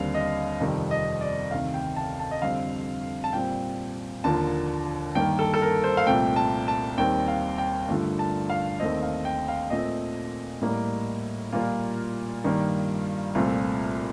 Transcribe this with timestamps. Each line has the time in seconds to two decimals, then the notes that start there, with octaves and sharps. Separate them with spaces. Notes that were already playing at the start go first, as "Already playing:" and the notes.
Already playing: D#2 D3 G3 C4 F5
0.15 D#5
0.60 F2 C3 D#3 G3 C4
0.91 D#5
1.21 D5
1.51 D2 C3 D#3 F5
1.74 G5
1.96 A5
2.19 A5
2.31 D#5
2.42 F2 D3 G3 C4 F5
3.24 A5
3.33 A#2 G3 C4 G5
4.24 D#2 D3 F3 A#3 A5
5.15 G2 D#3 A#3 G5
5.39 A4
5.54 A4
5.62 A#4
5.84 C5
5.97 F5
6.06 C2 A#2 A3 C4 G5
6.36 A5
6.68 A5
6.98 D#2 D#3 G3 C4 G5
7.28 F5
7.58 G5
7.89 G2 D3 F3 A3
8.19 A5
8.50 F5
8.80 D#2 D#3 A3 C4 D#5
9.03 F5
9.25 G5
9.48 F5
9.70 A#2 A3 C4 D#5
10.61 A2 G3 A#3
11.52 A#2 G3 A#3 F4
12.44 G2 D#3 G3 A#3
13.35 C2 A#2 A3 C4 F4